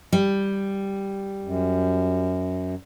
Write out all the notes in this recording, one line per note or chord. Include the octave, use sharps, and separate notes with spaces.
G3
F#2